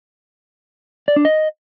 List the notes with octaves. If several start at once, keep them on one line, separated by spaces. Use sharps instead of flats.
D5
D4
D#5